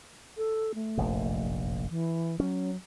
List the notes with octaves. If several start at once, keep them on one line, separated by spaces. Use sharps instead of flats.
A4
A3
F1 A#1 F#2
E3
F#3 C#4